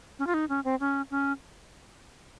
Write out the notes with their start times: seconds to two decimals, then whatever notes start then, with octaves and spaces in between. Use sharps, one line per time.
0.19 C#4
0.27 F4
0.34 D#4
0.49 C#4
0.65 C4
0.80 C#4
1.11 C#4